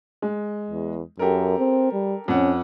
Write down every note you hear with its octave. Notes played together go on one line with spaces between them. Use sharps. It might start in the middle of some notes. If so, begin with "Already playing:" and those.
G#3
E2
F#2 G4 A4 A#4
C4
G3
F2 C#4 F#5